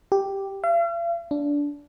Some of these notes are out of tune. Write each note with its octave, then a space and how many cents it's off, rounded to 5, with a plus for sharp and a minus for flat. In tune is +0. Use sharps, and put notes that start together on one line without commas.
G4 +0
F5 -45
D4 -20